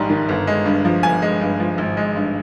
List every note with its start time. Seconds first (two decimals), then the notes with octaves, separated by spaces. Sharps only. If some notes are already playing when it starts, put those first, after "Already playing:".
Already playing: A#1 G#2 G3 A#5
0.10 D#3
0.29 G1
0.47 G#3
0.66 G2
0.85 F3
1.03 G1 G#5
1.22 G#3
1.41 G2
1.60 F3
1.78 G#1
1.97 G#3
2.16 G2